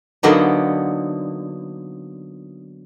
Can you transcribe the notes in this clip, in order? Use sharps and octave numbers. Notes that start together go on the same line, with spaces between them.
D3 F#3 A#3 B3 D#4